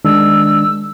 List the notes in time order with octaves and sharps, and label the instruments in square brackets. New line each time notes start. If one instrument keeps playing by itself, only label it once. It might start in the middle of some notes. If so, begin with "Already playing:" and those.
[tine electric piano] D#3 G#3 D4 [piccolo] E6